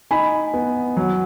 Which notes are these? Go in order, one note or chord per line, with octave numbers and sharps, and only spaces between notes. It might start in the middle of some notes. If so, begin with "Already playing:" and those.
D#4 G#5 B5
B3
F#3